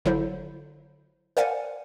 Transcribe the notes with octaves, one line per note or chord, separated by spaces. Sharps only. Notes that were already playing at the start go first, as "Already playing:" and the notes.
G1 D3 F#3 E4 C5
A#4 C5 D5 F5 F#5 G#5